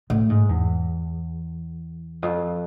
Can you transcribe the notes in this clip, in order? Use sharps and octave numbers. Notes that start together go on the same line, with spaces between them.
A2
G#2
E2
F2